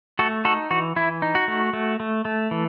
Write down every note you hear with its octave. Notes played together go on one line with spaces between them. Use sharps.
A3 F#4 A4
D#4 F#4 A4
E3 F#4
E3 E4
D#4
F#4
A3
A3
A3
A3
E3